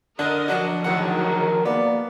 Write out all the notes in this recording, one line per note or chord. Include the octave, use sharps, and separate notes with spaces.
D3 D4 A#4 D#5
F3 F#3 D4 F#4
A2 D3 D#3 F#3 G#4 F#5
A#4
A#3 B3 D5